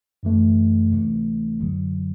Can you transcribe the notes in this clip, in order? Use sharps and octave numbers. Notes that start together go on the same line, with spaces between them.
F#2 E3 A3
D2 C3 E3 A3
G1 F#2 D3 F#3